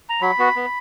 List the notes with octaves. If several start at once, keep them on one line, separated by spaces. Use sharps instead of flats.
A#5
F#3 B5
B3 F#4
B3